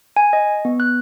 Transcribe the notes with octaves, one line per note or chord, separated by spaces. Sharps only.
G#5
D#5
B3
F#6